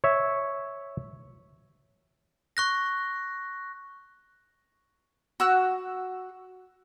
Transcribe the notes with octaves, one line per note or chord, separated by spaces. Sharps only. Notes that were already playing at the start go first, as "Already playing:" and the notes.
C#5 E5
C#6 F#6 A#6
F#4 E6 F#6